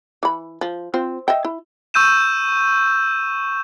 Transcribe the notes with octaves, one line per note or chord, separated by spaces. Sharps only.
E3 B5
F3
C4 F4 C5
D#5 E5 G5
E4
C#6 E6 G6 D#7 E7